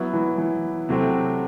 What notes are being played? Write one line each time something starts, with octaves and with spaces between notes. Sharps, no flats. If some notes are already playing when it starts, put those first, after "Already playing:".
Already playing: F#3 B3 E4
E3
E3
C3 F#3 A3 C4